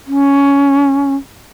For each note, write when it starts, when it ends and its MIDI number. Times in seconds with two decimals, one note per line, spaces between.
0.07 1.15 61